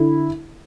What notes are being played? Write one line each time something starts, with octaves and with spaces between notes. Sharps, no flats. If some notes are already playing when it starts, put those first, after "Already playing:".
Already playing: D3 E4